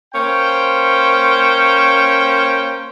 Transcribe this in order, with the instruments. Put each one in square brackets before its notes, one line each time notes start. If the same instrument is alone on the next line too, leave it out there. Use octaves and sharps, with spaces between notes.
[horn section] A#3 C#4 C5 G5